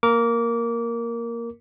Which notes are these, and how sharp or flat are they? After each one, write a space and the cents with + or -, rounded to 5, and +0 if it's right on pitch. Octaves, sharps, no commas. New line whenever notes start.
A#3 +0 A#4 +0 D6 -25